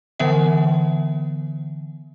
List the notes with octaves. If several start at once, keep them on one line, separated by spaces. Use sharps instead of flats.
D3 E3 B3 E5